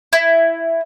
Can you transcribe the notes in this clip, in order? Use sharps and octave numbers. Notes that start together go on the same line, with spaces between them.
E4